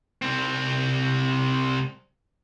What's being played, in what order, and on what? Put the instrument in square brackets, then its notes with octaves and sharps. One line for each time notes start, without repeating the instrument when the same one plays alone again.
[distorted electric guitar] C2 C4